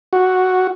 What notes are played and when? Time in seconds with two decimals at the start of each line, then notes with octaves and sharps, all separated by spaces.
0.13 F#4